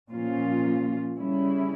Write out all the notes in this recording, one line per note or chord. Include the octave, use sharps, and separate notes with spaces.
A#2 F3 C#4 F4
C#3 G3 C#4 E4